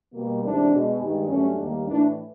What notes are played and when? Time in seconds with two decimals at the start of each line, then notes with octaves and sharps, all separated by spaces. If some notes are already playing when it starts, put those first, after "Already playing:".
0.13 B2 G3 A#3
0.42 D2 C3 E3 G#3 D4
0.71 B2 G#3
0.99 G2 D#3 G#3
1.28 G2 D3 F#3 A3 C#4
1.57 D#2 D#3 G3 A#3
1.85 A2 E3 A3 D4